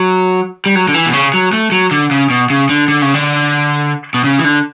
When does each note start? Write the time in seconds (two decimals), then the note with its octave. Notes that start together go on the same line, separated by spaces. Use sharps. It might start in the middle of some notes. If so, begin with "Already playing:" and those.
Already playing: F#3
0.66 G3
0.75 F#3
0.88 D3
0.94 E3
1.06 B2
1.13 C#3
1.34 F#3
1.53 A3
1.72 F#3
1.91 D3
2.11 C#3
2.30 B2
2.50 C#3
2.69 D3
2.88 D3
3.02 C#3
3.14 D3
4.14 B2
4.24 C#3
4.39 E3
4.44 D3